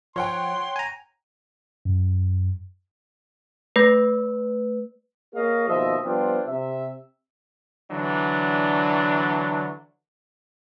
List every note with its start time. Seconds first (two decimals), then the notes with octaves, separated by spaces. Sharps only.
0.16 F3 C#5 F#5 G5 C6
0.76 G#5 A#5
1.85 F#2
3.76 A3 B4
5.35 A#3 G#4 A#4 C#5 D#5 F5
5.68 D#2 B2 F3 D#5 E5
6.05 F3 G3 B3 C4 D4 F4
6.47 C3 E5
7.91 D3 E3 F#3 D4